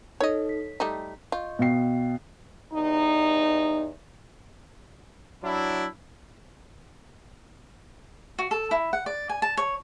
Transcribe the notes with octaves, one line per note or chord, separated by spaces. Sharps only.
D#4 A4 C#5 D#5
B6
G3 A3 D#4
F4 D#5 C#6 G6
B2 B3 F5 G5 C7
E2 G2 D#4
F#3 D4 E4
F#4
A4
E4
F#5
D5
G#5
A5
C#5